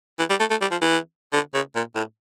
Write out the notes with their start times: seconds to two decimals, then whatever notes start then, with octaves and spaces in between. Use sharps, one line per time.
0.19 E3
0.30 G3
0.40 A3
0.50 A3
0.61 G3
0.71 F3
0.81 E3
1.33 D3
1.54 C#3
1.75 A#2
1.95 A2